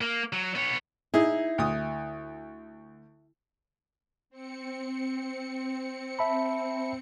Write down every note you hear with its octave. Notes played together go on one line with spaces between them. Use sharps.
A#3
F#3
B3 C#5
D#4 E4 G#4
D2 D#6
C4 C#7
E5 A5 B5